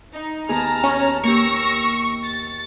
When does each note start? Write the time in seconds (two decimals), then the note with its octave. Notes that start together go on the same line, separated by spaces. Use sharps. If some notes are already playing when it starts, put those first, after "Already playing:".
0.14 D#4
0.49 D#2 B3 G#4 A5 A#5 F6
0.84 C#4
1.24 A#3 G4 C#6 E6 F6 A#6
2.23 A6